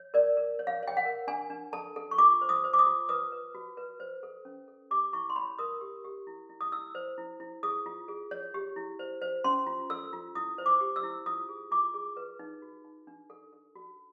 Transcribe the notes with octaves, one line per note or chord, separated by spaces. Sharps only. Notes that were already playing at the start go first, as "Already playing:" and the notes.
Already playing: C#5
A#4 D5
A#4
C#5
F5
C#5 G5
F#5
A#4
D4 G#5
D4
A4 A5
A4
C#6
F4 D6
C5
D#6
C5
D6
D#6
F4
B4 D#6
B4
F#4
B4
C5
A4
C#4
A4
G4 D6
E4 C#6
C6
C#5 B5
A#4 D#6
G4
G4
E4
E4
D#6
E4 E6
C5
E4
E4
G#4 D#6
F4
G#4
C#5
G4
E4
C5
C5
C#4 C6
F4
A4 E6
F4
E4 D#6
C5
D6
G4
E6
E4
F4 D#6
G#4
F4 D6
G#4
B4
D#4
F#4
D#4
D4
A4
A4
F#4